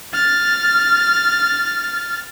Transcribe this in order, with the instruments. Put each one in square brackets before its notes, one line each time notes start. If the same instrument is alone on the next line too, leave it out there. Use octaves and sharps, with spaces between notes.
[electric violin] F6 A6